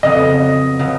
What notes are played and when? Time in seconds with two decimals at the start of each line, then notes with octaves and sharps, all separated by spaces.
0.03 F2 C#3 F#3 B3 D#5
0.79 C#3 F#3 B3